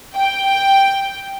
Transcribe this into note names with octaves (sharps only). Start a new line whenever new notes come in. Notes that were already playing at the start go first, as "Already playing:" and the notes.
G5